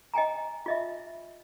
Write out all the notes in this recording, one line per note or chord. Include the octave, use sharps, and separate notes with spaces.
D#5 G5 G#5 A#5
F4 D#5 E5